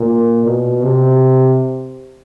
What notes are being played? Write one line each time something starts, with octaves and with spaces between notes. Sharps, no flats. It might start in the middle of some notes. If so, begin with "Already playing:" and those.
Already playing: A#2
B2
C3